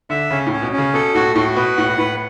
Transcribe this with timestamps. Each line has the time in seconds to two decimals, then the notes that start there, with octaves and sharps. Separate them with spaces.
0.10 D3 E5
0.31 C#3 C#4
0.47 A2
0.52 C#4
0.62 B2
0.72 C#4
0.78 C#3
0.94 B2 A4
1.15 A2 F#4
1.35 A2 F#4
1.56 B2 B4
1.77 A2 F#5
1.98 A2 B4